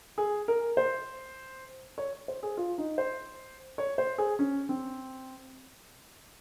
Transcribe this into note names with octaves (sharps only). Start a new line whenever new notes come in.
G#4
A#4
C5
C#5
C5
G#4
F4
D#4
C5
C#5
C5
G#4
C#4
C4